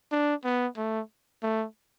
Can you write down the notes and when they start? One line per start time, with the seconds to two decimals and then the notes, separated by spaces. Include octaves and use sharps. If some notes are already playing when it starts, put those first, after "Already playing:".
0.12 D4
0.44 B3
0.77 A3
1.43 A3